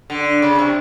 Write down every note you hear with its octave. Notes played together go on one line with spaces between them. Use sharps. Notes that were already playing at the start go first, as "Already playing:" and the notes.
D3
C#3
C3